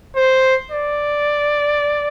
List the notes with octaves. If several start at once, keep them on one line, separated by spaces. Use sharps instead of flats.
C5
D5